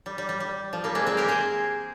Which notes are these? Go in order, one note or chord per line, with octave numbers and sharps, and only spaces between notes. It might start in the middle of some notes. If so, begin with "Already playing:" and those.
G3
G3
G3
G3
F3
G3 A#3
G#3 C4
G#3 C4
G4 A#4
G#4 C5